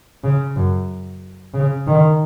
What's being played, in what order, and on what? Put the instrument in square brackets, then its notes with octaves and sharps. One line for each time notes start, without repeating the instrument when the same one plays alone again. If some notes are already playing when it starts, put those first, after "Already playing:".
[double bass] C#3
F#2
C#3
D#3